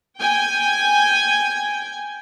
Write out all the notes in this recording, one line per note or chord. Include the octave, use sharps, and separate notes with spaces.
G5 G#5